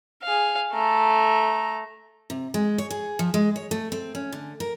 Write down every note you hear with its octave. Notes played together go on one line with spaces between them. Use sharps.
G#4 F5
A3 A#5
C3
G#3
C#5
G#4
F3
G#3
C#5
A3
C4
C#4
D3
A#4